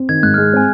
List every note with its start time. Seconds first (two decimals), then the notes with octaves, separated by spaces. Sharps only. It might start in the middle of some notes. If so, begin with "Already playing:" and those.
Already playing: C4
0.09 D#3 G#6
0.23 G#2 F#6
0.34 G#3 F6
0.53 C4 G#5